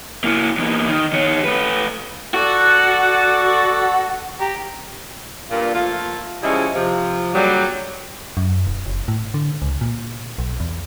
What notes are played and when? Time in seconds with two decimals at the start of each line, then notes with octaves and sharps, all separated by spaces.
0.24 A#3 E4
0.58 E2 A#3
0.88 D#3
1.13 D#3 C#5
1.44 A3 B4
2.34 F#4 A4 D5 F#5
4.41 G4 A#5
5.51 G2 A#2 F4
5.75 F3 A3 A#3 F4
6.43 C#3 F3 G3 G#3 C#4 E4
6.75 C3 F3
7.34 G2 A#2 C#3 F#3 G3
8.37 F#2
8.67 E1
8.86 F#1
9.08 A2
9.34 D3
9.62 C#2
9.81 A#2
10.38 B1
10.60 E2